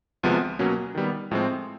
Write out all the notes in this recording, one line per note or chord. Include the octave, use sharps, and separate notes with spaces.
D2 C3 F3 G#3 B3
B2 F#3 A#3 C#4
D#3 G3 B3
A2 F3 G#3 C4